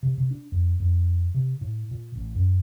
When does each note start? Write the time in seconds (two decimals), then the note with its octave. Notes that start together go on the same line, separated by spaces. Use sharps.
0.03 C3
0.18 C3
0.31 D4
0.52 F2
0.80 F2
1.35 C3
1.61 A2
1.91 A#2
2.16 A1
2.35 F#2